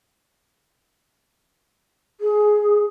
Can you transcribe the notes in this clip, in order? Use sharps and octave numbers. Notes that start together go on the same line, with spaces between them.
G#4